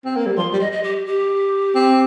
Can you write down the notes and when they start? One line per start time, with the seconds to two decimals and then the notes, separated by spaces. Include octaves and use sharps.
0.05 C4
0.16 A#3
0.26 G3
0.37 F3 C6
0.53 G3
0.60 D#5
0.72 D#5
0.83 G4
1.06 G4
1.75 C4